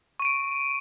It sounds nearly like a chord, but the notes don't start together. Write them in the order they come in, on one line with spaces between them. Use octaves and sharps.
C#6 D#7 D7